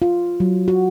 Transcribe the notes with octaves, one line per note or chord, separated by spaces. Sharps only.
F4
F#3
F#4